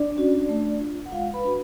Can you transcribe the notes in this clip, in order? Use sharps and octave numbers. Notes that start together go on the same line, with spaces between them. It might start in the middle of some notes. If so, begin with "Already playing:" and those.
Already playing: D4 D5
C#4 F#4
A3
F4
F#5
G#3 F4 F5
B4 B5
D4 F#4